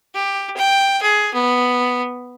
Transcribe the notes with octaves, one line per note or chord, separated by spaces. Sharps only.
G4
G5
G#4
B3